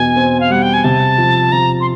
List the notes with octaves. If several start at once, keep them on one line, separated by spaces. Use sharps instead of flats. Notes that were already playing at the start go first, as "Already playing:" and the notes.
Already playing: E2 B2 G#5
C4
F5
G3 F#5
G5
G#5
C3 A5
F3
C3 A#5
C6